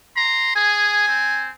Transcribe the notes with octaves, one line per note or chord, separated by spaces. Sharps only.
A#5 C6
G#4 G#5
C4